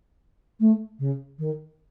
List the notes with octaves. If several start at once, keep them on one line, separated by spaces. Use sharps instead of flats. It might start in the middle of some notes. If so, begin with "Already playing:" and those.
A3
C#3
D#3